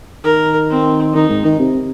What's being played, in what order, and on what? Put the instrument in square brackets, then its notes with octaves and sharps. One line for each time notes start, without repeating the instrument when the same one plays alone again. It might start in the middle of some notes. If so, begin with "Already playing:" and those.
[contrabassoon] D#3 [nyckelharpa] A#4
[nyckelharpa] C4
[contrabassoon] D#3 [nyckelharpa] D#4
[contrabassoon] G#2
D#3
C3